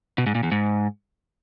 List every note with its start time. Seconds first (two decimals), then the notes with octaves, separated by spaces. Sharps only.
0.18 B2
0.26 G#2
0.35 A#2
0.43 E2
0.52 G#2